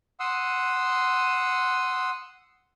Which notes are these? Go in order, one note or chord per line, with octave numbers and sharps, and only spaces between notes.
F#5 C6 D#6 E6